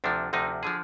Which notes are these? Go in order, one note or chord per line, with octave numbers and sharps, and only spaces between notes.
D2 C3 F3 D4
D2 C3 F3 D#4
D3 F3 G#4